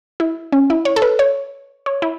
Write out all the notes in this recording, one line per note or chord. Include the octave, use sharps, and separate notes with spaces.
E4
C#4
E4
C#5
A4
B4
C#5
C#5
E4